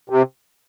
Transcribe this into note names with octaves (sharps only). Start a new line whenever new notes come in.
C3